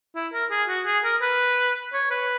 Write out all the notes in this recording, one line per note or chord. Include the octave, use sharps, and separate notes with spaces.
E4
A#4
G#4
F#4
G#4
A#4
B4
C#5
B4